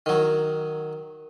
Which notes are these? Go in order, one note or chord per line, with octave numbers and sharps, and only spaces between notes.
D#3 F#3